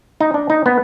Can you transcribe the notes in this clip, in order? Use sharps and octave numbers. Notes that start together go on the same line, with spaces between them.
D#4
D4
D#4
B3